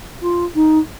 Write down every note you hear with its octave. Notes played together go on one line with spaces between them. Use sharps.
F4
D#4